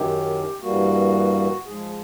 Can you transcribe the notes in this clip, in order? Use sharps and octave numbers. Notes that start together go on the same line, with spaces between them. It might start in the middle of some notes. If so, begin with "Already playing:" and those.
Already playing: F#2 D#3 F#3 G4
G2 E3 G3 A#3 F#4
G#2 F3 G#3 G#4